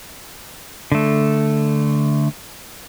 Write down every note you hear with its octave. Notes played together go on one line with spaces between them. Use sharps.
D3 A3